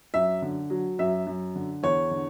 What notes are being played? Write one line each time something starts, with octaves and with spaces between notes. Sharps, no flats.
F#2 E5
D3
F#3
F#2 E5
F#2
D3
E2 C#5
D3